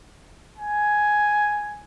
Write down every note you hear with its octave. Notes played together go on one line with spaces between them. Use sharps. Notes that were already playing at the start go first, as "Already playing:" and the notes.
G#5